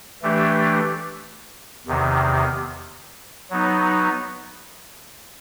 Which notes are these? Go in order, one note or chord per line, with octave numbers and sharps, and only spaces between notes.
E3 A3 D4 G4
E2 C3 D#3
F#3 B3 D#4